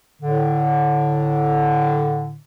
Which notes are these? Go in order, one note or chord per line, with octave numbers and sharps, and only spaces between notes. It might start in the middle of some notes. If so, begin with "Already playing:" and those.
A2 D3